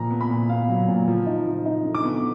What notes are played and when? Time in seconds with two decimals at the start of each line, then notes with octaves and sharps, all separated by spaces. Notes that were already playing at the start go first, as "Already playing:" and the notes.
Already playing: A#2 F3 A#5
0.11 B3
0.20 B5
0.30 A#2
0.49 B3 F5
0.69 F#3
0.88 A#2
1.08 F3
1.26 D#4
1.46 F3
1.65 D#4
1.85 D3
1.95 D6
2.04 B3